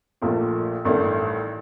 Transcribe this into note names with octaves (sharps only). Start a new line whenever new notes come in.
A#1 A#2 F3 A3
A1 G2 D#3 A3